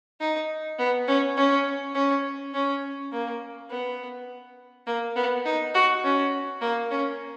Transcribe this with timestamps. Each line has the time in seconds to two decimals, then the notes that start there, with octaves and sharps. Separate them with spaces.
0.20 D#4
0.79 B3
1.08 C#4
1.37 C#4
1.95 C#4
2.54 C#4
3.12 A#3
3.70 B3
4.87 A#3
5.16 B3
5.45 D#4
5.74 F#4
6.04 C#4
6.62 A#3
6.91 C#4